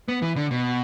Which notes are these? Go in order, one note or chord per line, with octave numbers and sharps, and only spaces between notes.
B3
E3
D3
B2